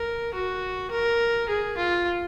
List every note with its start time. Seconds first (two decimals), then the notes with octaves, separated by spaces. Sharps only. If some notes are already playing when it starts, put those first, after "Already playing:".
Already playing: A#4
0.34 F#4
0.91 A#4
1.48 G#4
1.77 F4